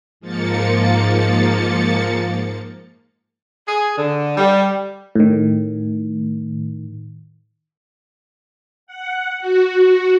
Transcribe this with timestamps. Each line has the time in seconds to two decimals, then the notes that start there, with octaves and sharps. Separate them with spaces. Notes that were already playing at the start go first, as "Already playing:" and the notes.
0.20 G#2 F3 A#3 A6 C#7
3.67 G#4
3.98 D3
4.37 G3
5.16 A2 D#3
8.87 F#5
9.40 F#4